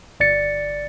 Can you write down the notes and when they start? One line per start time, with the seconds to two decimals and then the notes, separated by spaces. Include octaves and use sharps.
0.20 G1 D5 A6 C#7